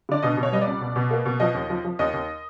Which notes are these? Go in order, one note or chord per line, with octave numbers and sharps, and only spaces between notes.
D3 D5
B2 D#5
B2
C#5
G3 D#5
D5
C#2
B2
B2
A#3
B2
F3 D#5
D#2
F3
F3
D#2 D#5
D#2